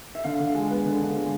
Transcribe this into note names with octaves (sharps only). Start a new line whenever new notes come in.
E5
D3 F5
D3
G#3
B3
D3
D3
G#3